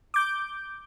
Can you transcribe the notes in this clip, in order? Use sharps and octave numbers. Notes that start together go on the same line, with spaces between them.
D6 G6